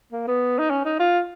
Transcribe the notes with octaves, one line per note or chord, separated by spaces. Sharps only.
A#3
B3
D#4
C#4
D#4
F4